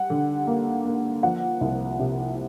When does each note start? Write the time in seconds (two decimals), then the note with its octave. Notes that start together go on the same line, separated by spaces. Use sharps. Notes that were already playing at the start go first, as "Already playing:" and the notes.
Already playing: G3 F#5
0.10 D3
0.47 A#3
0.85 A#3
1.23 F3 F#5
1.61 C2
2.00 C3